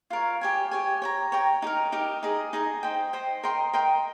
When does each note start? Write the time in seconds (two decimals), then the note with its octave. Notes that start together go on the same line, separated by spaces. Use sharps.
0.10 F4 A#4 C#5
0.41 G4 C#5 G#5
0.71 G4 C#5 G#5
1.02 C#5 G5 A#5
1.32 C#5 G5 A#5
1.62 D#4 G4
1.67 A#4
1.92 D#4 G4 A#4
2.23 D#4 G#4 D#5
2.53 D#4 G#4 D#5
2.83 C5 D#5 G5
3.13 C5 D#5 G5
3.43 A#4 D#5 G5 C6
3.73 A#4 D#5 G5 C6